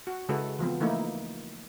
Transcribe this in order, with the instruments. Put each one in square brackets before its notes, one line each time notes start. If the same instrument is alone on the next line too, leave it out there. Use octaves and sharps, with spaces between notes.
[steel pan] F#4
C#3 G#3 E4 F#4 A4 B4
E3 F3 B3 C4
E3 A3 A#3 D#4 E4